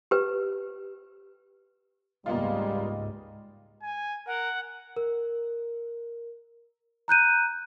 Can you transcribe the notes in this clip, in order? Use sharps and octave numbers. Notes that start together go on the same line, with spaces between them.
G4 B4
C#2 G#2 G3 G#3 A#3 B3 F4
G#5
A#4 F#5
A#4
A#5 F#6 G6 D#7